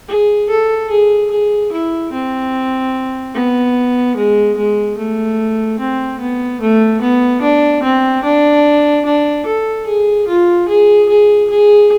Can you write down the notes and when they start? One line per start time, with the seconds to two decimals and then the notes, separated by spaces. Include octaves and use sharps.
0.08 G#4
0.49 A4
0.91 G#4
1.31 G#4
1.72 E4
2.12 C4
3.35 B3
4.16 G#3
4.57 G#3
4.98 A3
5.79 C4
6.20 B3
6.61 A3
7.01 B3
7.42 D4
7.83 C4
8.23 D4
9.05 D4
9.46 A4
9.86 G#4
10.28 F4
10.68 G#4
11.09 G#4
11.50 G#4